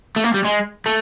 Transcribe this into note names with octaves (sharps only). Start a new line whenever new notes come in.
A3
A#3
G3
G#3
A3